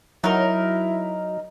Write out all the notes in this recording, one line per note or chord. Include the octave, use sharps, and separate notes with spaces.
F#3 D#4 E4 A#4